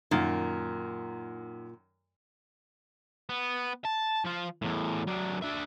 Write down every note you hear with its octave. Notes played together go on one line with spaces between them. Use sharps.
F#2 A#2 D#3
B3
A5
F3 F4
E2 A2
F#3 D4
D4 E5